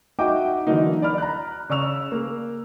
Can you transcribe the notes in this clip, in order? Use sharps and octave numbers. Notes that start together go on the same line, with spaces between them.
D#4 F#4 D#5 E5 G5 D6
D3 E3 F#3 A#3 D#4
D5 B5 F6
A#5 B5 F#6
C#3 D5 C#6 E6 F7
A#3